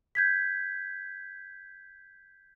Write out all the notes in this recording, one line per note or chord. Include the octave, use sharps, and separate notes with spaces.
G6 G#6 B6